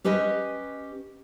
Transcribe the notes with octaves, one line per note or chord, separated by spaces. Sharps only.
C#4 G4 B4 D#5 G#5